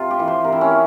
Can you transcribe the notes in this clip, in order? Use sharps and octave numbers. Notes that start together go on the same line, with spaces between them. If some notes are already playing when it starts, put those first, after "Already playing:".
Already playing: C3 F4
G4
E3
C5
C3 A#4
E4
C#4
E3